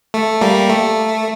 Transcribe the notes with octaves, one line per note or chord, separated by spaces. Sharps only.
A3
G3 A#3
A3